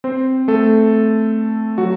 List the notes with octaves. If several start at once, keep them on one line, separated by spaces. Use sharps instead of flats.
C4 C5
A3 A4
F#3 F#4